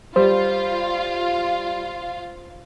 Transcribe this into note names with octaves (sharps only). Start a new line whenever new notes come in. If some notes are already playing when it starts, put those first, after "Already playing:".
G3 F4 C5 F5